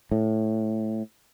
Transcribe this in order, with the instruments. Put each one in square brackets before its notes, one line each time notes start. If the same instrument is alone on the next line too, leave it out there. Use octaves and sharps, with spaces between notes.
[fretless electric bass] A2